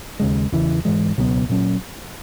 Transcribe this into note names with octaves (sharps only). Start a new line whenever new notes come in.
D#2 C#3 G#3
E2 C#3 E3
G#2 E3 G#3
C#2 B2 F#3 B3
A#2 F#3 C#4